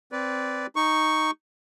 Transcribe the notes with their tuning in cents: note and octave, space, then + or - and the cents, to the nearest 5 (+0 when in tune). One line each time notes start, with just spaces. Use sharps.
C4 +0 B4 +0 D5 -15
D#4 +0 C#6 +0